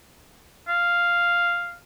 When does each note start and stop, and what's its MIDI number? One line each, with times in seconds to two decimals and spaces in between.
0.68 1.75 77